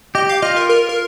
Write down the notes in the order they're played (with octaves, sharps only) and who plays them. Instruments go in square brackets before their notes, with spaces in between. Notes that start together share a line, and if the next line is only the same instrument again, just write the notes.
[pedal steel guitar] G4 [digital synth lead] D#5
[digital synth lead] F5
[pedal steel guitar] F4 [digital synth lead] D#5
[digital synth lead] A#4
A#4
A#4